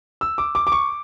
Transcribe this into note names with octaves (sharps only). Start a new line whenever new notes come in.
E6
D6
D6
D6
C#6